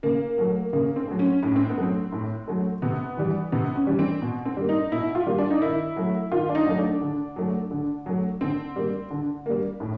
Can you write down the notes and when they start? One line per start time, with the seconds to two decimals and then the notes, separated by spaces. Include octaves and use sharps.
0.03 C#3 A#3
0.38 F#3 A3
0.73 C#3 A#3
0.96 C4
1.07 F#3 A3
1.19 C#4
1.43 A2 C#4
1.56 C4
1.69 B3
1.78 F#3 A3
1.83 C4
2.12 A2
2.48 F#3 A3
2.82 C3 B3
3.17 E3 G3
3.52 C3 B3
3.75 C#4
3.87 E3 G3
3.99 C4
4.22 B2
4.45 C4
4.57 G3 A#3
4.69 D#4
4.92 B2 E4
5.15 F4
5.26 G3 A#3
5.38 D4
5.50 D#4
5.62 D#3 E4
5.96 F#3 A3
6.31 D#3 F4
6.49 D4
6.55 D#4
6.66 F#3 A3
6.78 D4
7.01 D3
7.36 F#3 A3
7.71 D3
8.06 F#3 A3
8.41 D3 C4
8.76 G3 A#3
9.10 D3
9.46 G3 A#3
9.80 A2